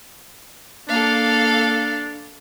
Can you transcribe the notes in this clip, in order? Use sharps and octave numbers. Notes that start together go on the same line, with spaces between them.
A#3 D4 A4 F5